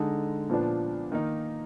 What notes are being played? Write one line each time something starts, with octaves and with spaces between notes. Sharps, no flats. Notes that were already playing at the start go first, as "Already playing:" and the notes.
Already playing: D3 G#3 D#4
A#2 F3 B3 D4
D#3 A#3 D#4